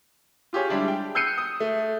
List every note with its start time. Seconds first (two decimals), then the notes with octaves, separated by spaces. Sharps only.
0.53 F4 G4 G#4 C#5
0.69 G3 G#3 D4 E4
0.88 G5
1.15 E6 F#6 G6 C7 C#7 D#7
1.38 D#6
1.60 A3